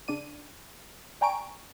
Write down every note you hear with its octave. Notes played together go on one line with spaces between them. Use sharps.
C#3 D4 D5 D#7
D5 G5 G#5 A#5 C#6 D7